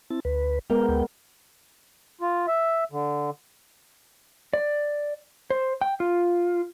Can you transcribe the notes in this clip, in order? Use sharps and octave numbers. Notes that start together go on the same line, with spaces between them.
C4 E4 A5
D2 B4
G#3 B3 A#4 F5 G5
D2 G5
F4
E5
D3
D5
C5
G5
F4